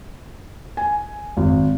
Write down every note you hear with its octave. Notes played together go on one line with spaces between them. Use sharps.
G#5
G#1